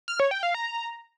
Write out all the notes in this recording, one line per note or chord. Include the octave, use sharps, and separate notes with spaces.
F6
C#5
G5
F5
A#5